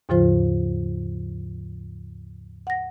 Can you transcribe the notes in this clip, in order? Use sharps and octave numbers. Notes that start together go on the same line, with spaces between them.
D#2 G#2 C#3 F3 F4 C5
F#5 A#6